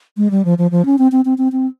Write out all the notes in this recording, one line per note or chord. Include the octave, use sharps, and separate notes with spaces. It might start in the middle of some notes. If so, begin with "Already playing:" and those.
G#3
G3
F3
F3
F3
C#4
C4
C4
C4
C4
C4